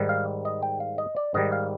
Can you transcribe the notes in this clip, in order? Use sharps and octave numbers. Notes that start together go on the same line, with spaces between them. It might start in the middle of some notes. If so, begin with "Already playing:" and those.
Already playing: G#2 D#3 G3
F5
D#5
G5
F5
D#5
D5
G#2 D#3 G3 D#5
F5